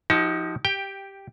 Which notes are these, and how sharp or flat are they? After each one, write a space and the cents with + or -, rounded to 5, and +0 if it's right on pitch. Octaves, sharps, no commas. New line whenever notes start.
F3 +0 D#4 +30 G4 -45
G4 +0 G5 +10